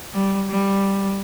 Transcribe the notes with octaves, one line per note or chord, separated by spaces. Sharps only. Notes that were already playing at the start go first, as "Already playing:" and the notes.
G3
G3